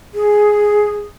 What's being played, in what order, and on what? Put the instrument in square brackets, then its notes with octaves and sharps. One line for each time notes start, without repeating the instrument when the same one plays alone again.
[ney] G#4